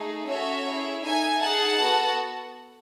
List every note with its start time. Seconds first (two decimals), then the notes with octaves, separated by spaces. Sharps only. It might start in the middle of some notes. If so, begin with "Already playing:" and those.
Already playing: A3 D#4 G#4
0.27 C#4 F#4 A4 C#5 E5
0.65 C#4 E4 G#4
1.03 D#4 A4 E5 G#5
1.40 D#4 G#4 F#5 A5
1.78 B3 F#4 A4